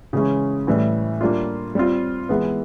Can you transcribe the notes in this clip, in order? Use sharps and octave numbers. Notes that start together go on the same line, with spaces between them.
C#3 E3 G#3 C#4
A2 E3 G3
G3 A#3 D4 F4
G3 C4 F4
E3 G#3 B3